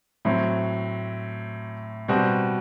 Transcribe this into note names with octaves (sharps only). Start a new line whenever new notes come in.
A2 F#3 C4
B2 G3 C4 F#4